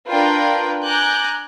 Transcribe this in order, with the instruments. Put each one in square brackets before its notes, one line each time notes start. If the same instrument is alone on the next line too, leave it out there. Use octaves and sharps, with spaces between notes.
[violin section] D4 F4 A#4 B4 G5
G#5 A#5 D6 F#6 G6